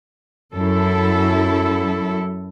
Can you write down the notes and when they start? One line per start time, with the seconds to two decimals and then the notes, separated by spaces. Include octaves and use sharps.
0.55 F#2 E4 A4